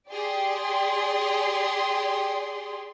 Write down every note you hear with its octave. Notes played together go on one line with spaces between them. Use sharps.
G4 G#4 D5 C6